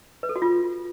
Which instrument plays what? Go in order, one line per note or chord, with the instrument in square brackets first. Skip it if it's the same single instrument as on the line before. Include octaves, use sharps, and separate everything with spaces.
[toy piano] B4
A4
F#4
F4